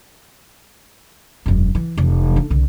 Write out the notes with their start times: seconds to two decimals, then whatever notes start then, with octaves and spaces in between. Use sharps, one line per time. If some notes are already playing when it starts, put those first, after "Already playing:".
1.46 E1 F#2
1.75 E3
1.98 F1 E3
2.36 D4
2.50 C2 D3